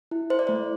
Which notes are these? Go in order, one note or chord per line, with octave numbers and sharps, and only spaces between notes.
E4
E4 C5
D5
A3 C5